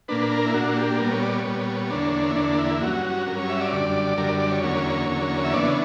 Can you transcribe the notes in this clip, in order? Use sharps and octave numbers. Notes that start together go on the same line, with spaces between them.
A#2 A#3 D4 B4
B4
A#4
E4
A#2 A#3 D4 F#4
F#4
G4
A#2 G3 B3 A#4
C#5
D5
C#5
A#2 G3 B3
E2 D3 A#3 D4
E4
E2 D3 A#3 D4
E4
G2 F#3 C#4 F#4
G2 F#3 C#4 A#4
C#5
E5
D5
F#2 D3 G3
F#2 D3 G3 A#4
D5
D5
C#5
E2 D3 F#3 A#3 C#4
E2 D3 F#3 A#3 C#4
E5
C#3 E3 B3 D4 D5
C#5